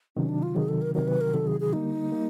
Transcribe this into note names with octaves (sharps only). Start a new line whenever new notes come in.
C3 D#3 F#3 C#4
D4
F4
C3 D#3 F#3 G#4
A4
A#4
C3 D#3 F#3 A#4
B4
A#4
C3 D#3 F#3 A4
G#4
G#4
D3 G3 A#3 D#4
G3 A#3